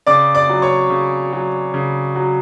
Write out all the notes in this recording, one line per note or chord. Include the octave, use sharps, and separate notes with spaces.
C#3 D5 D6
D5 D6
F#3
C#5 C#6
C#3
F#3
C#3
F#3